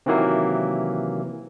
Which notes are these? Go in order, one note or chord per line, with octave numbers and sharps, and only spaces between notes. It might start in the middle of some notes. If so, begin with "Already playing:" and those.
C3 D#3 E3 F#3 A#3